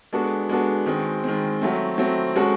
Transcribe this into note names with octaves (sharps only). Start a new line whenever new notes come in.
G#3 B3 D4 F#4 A4
G#3 B3 D4 F#4 A4
D#3 G#3 C4
D#3 G#3 C4
F#3 A3 C4
F#3 A3 C4
G#3 C#4 F#4 A4